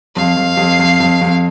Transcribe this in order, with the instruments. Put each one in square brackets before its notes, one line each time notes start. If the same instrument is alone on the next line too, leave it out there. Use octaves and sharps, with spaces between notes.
[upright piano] F2 [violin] F5
[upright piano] F2
F2
F2
F2
F2